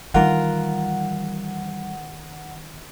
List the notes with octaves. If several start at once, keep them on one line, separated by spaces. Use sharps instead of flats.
D#3 E3 G3 F4 A#4 F#5